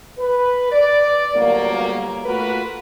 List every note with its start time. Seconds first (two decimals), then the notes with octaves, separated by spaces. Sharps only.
0.18 B4
0.72 D5
1.35 G1 D2 G2 F#3 A#3
2.25 A3 A#3 F4 F#4 A#4 B4